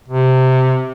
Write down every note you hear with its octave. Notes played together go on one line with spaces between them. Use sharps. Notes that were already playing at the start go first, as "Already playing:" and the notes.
C3